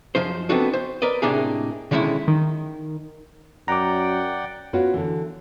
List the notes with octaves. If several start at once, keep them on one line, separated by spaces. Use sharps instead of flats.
F#2 F3 D#4 C5
B3 C4 D4 D#4 F#4 A4
C5
A#4 B4 D5 D#5
A2 C3 A#3 D4 D#4 G#4
B2 D3 D#3 G#3 C#4 E4
D#3
F#2 D5 F#5 G5 A#5 D6
B3 C#4 F4 F#4 C#5
D3 E3